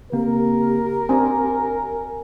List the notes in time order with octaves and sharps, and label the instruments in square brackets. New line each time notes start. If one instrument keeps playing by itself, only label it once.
[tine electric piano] C#3 A#3 C4 [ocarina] G4 [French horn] A#4
[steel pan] C4 D4 [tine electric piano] G#5